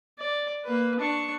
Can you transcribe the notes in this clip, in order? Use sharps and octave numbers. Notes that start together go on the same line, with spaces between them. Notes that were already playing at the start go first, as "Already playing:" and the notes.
D5
A#3 B4
D4 C#6